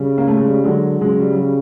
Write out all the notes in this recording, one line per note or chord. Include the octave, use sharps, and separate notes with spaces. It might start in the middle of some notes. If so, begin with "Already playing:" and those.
Already playing: C#3 G3
A#3
A3
G#3
G3
D3 F#3 G#3
C#3 F#3 G#3
G3
F#3
G3